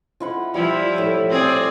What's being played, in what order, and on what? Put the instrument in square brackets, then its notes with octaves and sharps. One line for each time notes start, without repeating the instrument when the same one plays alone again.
[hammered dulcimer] F3 E4 F#5
[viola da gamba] F3 E4 [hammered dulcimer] G3
[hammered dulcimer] A2 C#5
[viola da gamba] C4 G#4 D5